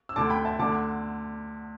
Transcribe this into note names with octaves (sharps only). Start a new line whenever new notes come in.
E6
D2 D3 A5 D6
G5 B5
E5 A5
D2 D3 A5 D6